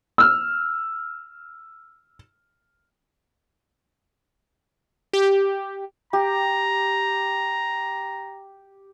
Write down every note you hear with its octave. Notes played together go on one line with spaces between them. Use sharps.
E6 F6
G4
G4 A#5